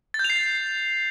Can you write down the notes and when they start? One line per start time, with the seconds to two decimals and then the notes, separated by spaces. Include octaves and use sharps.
0.14 A6
0.19 G6
0.24 F7
0.30 C7